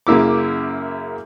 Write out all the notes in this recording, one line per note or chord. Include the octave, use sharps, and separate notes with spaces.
F#2 C#3 A#3 E4 D6